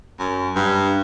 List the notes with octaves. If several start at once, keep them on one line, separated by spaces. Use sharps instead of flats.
F#2
G2